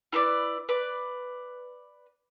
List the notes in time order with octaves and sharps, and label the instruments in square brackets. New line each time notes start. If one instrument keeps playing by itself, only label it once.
[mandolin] E4 A4 B4 D5
B4 D5